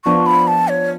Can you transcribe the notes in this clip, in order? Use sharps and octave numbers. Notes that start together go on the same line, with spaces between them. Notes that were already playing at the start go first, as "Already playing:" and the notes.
F3 B3 D4 F4 C#6
B5
A5
C#5